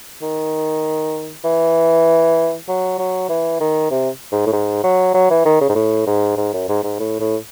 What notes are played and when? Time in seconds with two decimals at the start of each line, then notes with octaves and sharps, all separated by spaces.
0.22 D#3
1.44 E3
2.68 F#3
2.99 F#3
3.29 E3
3.61 D#3
3.91 C3
4.32 G#2
4.46 A2
4.53 G#2
4.84 F#3
5.14 F#3
5.30 E3
5.45 D#3
5.61 C#3
5.69 G#2
5.75 A2
6.07 G#2
6.37 G#2
6.53 F#2
6.69 G#2
6.83 G#2
7.00 A2
7.20 A2